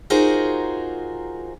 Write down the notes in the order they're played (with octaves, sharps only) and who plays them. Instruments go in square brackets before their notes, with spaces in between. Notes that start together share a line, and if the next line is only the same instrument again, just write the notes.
[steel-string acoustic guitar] D#4 F4 F#4 G#4 A#4 C5